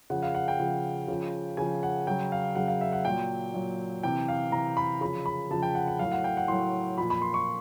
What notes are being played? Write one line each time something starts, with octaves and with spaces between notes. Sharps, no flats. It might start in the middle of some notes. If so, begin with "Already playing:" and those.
C#3 F3 F#5
F5
F#5
G5
C#3 F3
C#3 F3
C#3 F3 G#5
F#5
C#3 F#3 G5
F5
C#3 F#3 F#5
F5
E5
F#5
A#2 F#3 G5
A#2 F#3
C3 E3 G5
F5
C3 E3 A#5
B5
C#3 F3 B5
B5
C#3 F3 A5
G5
F#5
F#5
A2 F#3 F5
F#5
G5
F#5
A2 F#3 C6
A#2 F3 B5
B5
C6
C#6